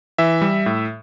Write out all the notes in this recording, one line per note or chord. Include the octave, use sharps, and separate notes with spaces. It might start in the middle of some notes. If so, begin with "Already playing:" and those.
E3 E5
G3
A2